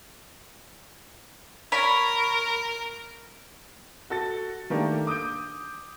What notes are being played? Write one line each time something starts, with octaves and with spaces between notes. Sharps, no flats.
A#4 C#5 B5
F#4 A4 A6
D#3 A3 A#3 D4 G4
D6 D#6 G6 D7